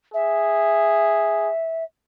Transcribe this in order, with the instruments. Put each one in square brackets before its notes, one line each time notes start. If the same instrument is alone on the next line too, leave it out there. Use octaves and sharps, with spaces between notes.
[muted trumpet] G#4 [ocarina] E5